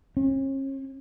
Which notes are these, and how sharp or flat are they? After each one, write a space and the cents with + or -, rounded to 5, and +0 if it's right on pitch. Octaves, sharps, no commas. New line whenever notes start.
C#4 -40